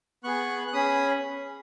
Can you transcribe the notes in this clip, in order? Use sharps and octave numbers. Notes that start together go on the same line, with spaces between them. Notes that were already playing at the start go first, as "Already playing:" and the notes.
B3 G#4 C#6 F#6
F#6
C#4 G#4 B5 D#6